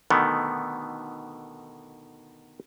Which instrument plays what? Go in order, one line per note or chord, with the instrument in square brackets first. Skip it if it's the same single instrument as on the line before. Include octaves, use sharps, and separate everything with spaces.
[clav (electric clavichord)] B2 D3 D#3 A3 B3